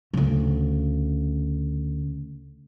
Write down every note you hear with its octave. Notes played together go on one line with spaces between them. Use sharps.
D2 C#3